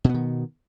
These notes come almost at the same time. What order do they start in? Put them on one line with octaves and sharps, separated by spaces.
B2 B3 D#3